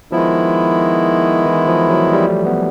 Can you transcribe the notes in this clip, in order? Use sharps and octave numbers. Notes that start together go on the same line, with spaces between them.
D#3 F3 G#3 B3 E4
E3
F3
F#3
G3
A3
B3